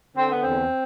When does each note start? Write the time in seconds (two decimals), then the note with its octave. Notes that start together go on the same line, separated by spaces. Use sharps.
0.16 D3 C4
0.30 B3
0.43 E2 C4